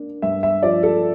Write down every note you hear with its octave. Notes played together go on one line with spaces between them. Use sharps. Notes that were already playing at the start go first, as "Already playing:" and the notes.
Already playing: A#3 D4
G2 E5
E5
F3 D5
A4